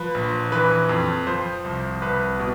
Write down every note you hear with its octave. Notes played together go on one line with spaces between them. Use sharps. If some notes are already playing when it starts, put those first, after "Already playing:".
Already playing: F3 B4
A#1
E3 B4
F2
F3 C5
C2
C2 B4
B2